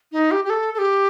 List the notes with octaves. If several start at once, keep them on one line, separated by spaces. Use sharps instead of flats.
D#4
G4
G4
A4
A4
G4